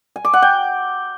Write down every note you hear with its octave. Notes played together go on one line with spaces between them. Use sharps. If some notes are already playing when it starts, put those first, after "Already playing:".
G#5
D6
F#5
G5